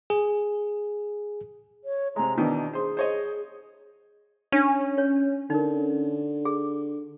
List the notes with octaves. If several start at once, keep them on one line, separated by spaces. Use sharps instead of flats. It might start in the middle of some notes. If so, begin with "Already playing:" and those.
G#4
C#5
C3 G#3 A#5
B2 D#3 E3 D4
G#4 C5 C6
C5 C#5 D#5
C#4 D4
C#5
D3 D#4 A#4
G#4